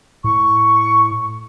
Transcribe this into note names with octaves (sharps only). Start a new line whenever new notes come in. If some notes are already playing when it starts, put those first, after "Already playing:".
A2 C#6